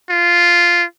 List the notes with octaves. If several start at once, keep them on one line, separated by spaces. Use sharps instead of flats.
F4